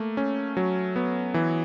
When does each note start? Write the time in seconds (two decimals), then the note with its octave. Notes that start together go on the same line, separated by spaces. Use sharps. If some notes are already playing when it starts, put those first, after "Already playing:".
Already playing: A3 A#3
0.17 C#4
0.57 F#3
0.96 B3
1.34 E3